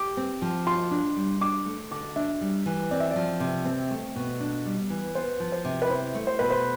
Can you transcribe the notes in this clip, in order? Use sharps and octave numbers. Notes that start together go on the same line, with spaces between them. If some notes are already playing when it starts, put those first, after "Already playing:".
Already playing: G4 D6
C4
F3
F4 C6
D4
G3
D4 D6
A3
D3 D6
D4 E5
G3
E3
C4 D5
E5
F3 D5
C3
C4
A3
B2
D4
G3
E3
B3 C5
F3
C5
C3
B4
E4 C5
A3
C5
B2 B4
C5